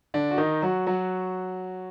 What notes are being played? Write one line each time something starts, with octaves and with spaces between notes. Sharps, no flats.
D3 D4
F#4
D#3 D#4
F#3 F#4
F#3 F#4